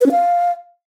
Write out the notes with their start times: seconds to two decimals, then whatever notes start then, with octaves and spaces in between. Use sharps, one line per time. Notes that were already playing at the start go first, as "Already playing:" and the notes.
0.01 B4
0.06 C#4
0.11 F5